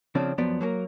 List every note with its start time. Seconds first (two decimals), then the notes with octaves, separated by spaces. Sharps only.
0.15 C#3 F3 C4 D4
0.38 F#2 F3 B3 D5
0.61 F#3 A#3 A4 A#4